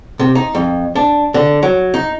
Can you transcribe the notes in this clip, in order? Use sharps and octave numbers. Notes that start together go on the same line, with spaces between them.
C3
D#4
F2
D4
D3
F#3
D#4